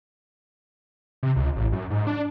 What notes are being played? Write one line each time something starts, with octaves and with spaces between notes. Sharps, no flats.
C3
C#2
A1
F#2
G#2
D4